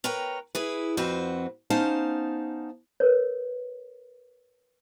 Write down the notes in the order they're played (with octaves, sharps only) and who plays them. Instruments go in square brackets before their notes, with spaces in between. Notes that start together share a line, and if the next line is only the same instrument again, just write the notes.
[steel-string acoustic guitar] A#4 B4 C#5 G5 A#5
E4 G#4 B4
F2 C4 F#4 B4
B3 C#4 D#4 C5 F5 A5
[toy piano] A#4 B4 C#5